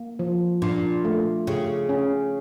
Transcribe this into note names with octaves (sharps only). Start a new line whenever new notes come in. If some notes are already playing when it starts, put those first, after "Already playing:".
Already playing: A#3
F3
A#2 D4
A3
C#3 G4
C#4